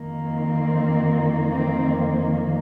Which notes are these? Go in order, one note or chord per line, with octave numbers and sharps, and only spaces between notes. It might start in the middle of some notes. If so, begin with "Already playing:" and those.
Already playing: F2 D#3 A#3
C4
C4